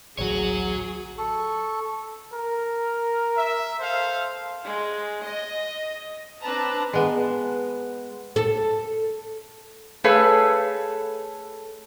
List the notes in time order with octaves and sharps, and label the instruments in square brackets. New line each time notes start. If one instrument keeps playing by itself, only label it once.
[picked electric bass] A1 D2 F#3 [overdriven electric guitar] F#4 C#5 [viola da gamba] G#4
[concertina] A4 C#6
[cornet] A#4
[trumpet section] E5
A4 C5 F5
[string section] G#3
D#5
C4 D4 B4 A5 A#5
[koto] G#3 B3
[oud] A4
[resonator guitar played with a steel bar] A3 G#4 A4 B4 C#5 F5